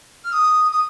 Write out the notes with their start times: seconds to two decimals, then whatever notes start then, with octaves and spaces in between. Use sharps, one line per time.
0.24 F6
0.32 D#6
0.72 D#6